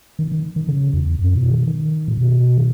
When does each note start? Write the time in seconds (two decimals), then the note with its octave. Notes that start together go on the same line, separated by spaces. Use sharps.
0.19 D#3
0.32 D#3
0.56 D#3
0.68 C#3
0.93 E2
1.19 F#2
1.35 B2
1.51 D#3
1.67 D#3
2.08 A#2
2.17 B2
2.58 D#3